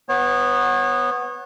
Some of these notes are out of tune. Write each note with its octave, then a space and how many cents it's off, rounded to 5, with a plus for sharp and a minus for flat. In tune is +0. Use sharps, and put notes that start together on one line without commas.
B3 +0 C#5 -30